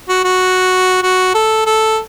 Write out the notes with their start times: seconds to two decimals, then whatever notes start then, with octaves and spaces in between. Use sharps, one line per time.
0.09 F#4
0.24 F#4
1.03 F#4
1.34 A4
1.66 A4